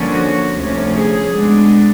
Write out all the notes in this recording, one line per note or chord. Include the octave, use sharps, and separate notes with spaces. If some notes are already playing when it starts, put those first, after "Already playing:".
Already playing: G2 D3 F3 A#3 C#4
F#4
D2 C3 F3 A3 C#4
G#4
B2 G#3 B3 D4